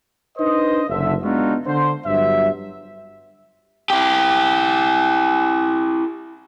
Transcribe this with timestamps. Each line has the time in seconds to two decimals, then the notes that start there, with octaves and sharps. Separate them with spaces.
0.38 D4 D#4 B4 C5 D#5
0.89 F#1 D3 E5
1.23 G#3 B3 D4 D#4 F4 F#4
1.66 D3 C5
2.05 G1 G2 F#3 E5
3.90 E4 G4